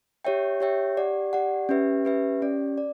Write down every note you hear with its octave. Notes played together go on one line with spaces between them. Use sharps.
G4 C#5 E5 G5
G4 C#5 E5 G5
G4 D5 F#5
G4 D5 F#5
C#4 G4 B4 E5
C#4 G4 B4 E5
C#4 G4 D5
D5